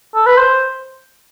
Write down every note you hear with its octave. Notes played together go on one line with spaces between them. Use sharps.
A4
B4
C5